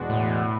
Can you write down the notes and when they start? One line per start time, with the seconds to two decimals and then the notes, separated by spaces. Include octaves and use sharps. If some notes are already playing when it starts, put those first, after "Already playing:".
Already playing: E2 B2 G#3 D4 F#4
0.10 A2